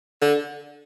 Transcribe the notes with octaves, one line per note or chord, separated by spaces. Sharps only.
D3